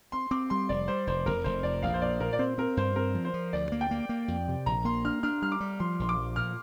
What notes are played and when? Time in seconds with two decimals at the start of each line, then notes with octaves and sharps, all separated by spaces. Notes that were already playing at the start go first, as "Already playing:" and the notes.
0.12 C4 C6
0.31 C4 D6
0.50 G3 C6
0.69 F1 D5
0.88 G3 C5
1.07 F1 C5
1.26 F1 A#4
1.44 F1 C5
1.63 F2 D5
1.83 A#1 F5
1.94 C5
2.02 A#2 D5
2.20 A#2 A#4
2.33 D5
2.39 C4 C5
2.58 C4 A#4
2.77 G2 C5
2.96 C4 A#4
3.15 F3
3.25 C5
3.34 F3
3.53 D2 D5
3.72 A#3
3.81 G5
3.91 A#3
4.09 A#3
4.28 F2
4.48 C3
4.66 A#1 A#5
4.85 A#3 C6
5.05 D4 F6
5.23 D4 F6
5.42 G3 F6
5.52 D6
5.60 G3
5.80 F3 C6
5.99 A#1 C6
6.09 D6
6.18 F3
6.36 A#2 F6